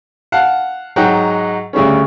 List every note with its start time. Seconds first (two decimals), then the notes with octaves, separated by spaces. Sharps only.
0.32 F5 F#5 A5
0.96 G#2 F#3 D#4 F#5 G5
1.73 D2 C#3 G3 C#4